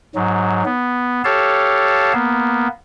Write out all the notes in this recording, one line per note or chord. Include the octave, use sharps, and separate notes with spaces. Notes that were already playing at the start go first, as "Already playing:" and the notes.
G#2 F#3
B3
G4 A4 C#5 F5 A5
A#3 B3